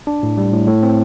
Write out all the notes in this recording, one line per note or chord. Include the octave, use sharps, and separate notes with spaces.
D4
A2
G3
A2
A2
C4